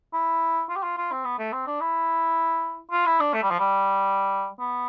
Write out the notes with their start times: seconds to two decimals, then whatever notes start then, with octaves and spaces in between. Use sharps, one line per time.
0.13 E4
0.69 F4
0.76 G4
0.83 F4
0.98 F4
1.12 C4
1.25 B3
1.39 A3
1.53 C4
1.67 D4
1.81 E4
2.92 F4
3.06 E4
3.20 D4
3.33 A3
3.43 G3
3.51 F3
3.59 G3
4.59 B3